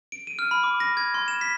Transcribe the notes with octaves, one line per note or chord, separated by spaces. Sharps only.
D7
D#7
F6
B5
D6
A#6
G#6
C6
E7
B6